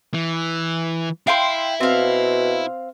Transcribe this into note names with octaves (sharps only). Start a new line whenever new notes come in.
E3
E4 F5 G5 C6
B2 C4 F5